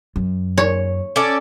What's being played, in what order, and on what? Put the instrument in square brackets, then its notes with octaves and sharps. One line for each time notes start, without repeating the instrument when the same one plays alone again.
[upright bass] F#2
[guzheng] C#5
[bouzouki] C#4 A4 D5